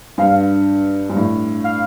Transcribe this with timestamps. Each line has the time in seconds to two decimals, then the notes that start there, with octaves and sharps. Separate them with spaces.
0.18 G2 F5
1.10 G2
1.16 A2
1.64 F5